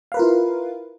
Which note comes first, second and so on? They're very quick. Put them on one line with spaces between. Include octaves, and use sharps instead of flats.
F5 B4 A#4 F4 E4